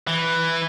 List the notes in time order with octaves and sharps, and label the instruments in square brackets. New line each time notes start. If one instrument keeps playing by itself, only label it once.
[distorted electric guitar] E3